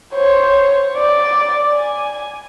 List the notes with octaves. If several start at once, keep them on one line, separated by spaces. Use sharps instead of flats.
C5 C#5
D5
G#5